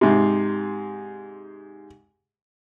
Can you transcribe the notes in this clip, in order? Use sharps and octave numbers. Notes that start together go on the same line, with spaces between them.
G#2 C3